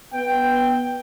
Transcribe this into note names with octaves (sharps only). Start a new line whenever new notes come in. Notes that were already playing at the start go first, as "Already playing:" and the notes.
B3 G5